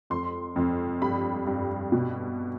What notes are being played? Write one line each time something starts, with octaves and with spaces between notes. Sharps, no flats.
F2 C6
F2
G2 B5
G2
B2